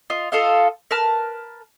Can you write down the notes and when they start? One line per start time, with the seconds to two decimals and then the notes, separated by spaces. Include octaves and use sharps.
0.10 F4 D#5
0.32 F4 A4 D#5 F5
0.91 A#4 B4 A5 F6